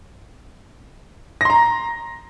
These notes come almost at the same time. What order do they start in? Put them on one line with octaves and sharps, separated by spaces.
A#6 C6 A#5